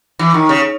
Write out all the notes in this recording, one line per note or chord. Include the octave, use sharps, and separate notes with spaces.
E3
D#3
C#3